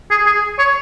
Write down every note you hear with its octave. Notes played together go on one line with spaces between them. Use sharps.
G#4
G#4
C#5